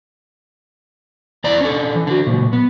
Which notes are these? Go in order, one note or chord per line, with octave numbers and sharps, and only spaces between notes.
E2 E3 D5 A#5
C#4 D4 A4
E3
D3 F#4
A#2 C#3 F#3
B3